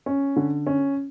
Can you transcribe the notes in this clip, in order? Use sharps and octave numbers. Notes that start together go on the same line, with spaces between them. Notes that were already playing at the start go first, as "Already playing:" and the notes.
C#4
D3
C#4